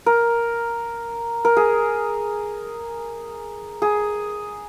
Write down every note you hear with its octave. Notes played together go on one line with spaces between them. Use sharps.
A#4
A#4
G#4
G#4